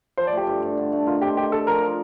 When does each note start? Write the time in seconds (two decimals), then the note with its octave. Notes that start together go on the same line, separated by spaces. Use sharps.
0.17 F3 C5
0.27 D5
0.32 A3 G4
0.47 G2
0.63 G2
0.77 D3
0.92 A3
1.07 D#3 F4
1.22 C4 G4
1.37 D#3 G4
1.52 D4 A4
1.67 F3 A#4
1.82 F3